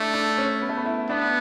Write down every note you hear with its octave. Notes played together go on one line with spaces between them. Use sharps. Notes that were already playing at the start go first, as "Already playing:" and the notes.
Already playing: A3 D4 E4
D4
C#4
B3
A3
B3
E4
B3 D4